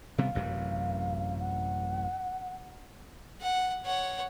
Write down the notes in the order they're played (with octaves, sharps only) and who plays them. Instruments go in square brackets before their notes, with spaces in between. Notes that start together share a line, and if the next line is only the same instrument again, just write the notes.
[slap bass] C3 G3 B3 [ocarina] F5
[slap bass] A1 F#2 C3
[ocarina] F#5
[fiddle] F#5
C#5 F#5